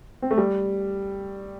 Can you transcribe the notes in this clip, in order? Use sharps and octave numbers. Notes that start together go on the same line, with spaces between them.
C4
A3
G3